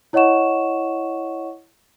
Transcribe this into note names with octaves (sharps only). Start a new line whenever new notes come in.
E4 C#5 D#5 F#5 C#6 E7